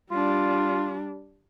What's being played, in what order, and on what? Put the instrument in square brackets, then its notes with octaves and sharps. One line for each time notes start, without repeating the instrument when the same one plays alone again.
[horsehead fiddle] G3 D4 [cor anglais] F4